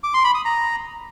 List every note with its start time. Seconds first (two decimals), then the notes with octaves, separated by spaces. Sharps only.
0.04 D6
0.14 C6
0.24 B5
0.35 D#6
0.45 A#5